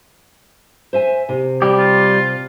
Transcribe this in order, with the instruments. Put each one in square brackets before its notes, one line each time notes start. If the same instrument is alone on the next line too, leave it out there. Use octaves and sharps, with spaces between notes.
[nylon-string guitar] C5 E5 G#5
C3
[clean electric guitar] G3 G4
[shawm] F4